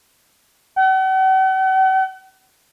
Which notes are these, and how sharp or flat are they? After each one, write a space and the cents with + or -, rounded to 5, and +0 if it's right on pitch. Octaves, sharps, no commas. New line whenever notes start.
F#5 +45